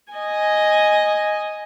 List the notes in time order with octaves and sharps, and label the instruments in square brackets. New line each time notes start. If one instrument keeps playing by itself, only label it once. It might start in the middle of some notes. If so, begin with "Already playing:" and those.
[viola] D#5 G#5